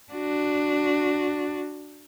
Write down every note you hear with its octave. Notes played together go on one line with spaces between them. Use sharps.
D4 F#4